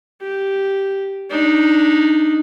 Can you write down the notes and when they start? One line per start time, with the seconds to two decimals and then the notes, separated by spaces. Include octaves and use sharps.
0.21 G4
1.30 D4 D#4